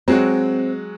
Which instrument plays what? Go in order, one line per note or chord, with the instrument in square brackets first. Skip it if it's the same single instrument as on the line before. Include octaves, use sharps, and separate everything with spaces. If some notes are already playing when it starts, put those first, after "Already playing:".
[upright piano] F#3 G#3 F#4 [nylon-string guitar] C4